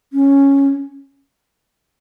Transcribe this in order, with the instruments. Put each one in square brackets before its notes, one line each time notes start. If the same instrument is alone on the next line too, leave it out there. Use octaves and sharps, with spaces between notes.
[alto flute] C#4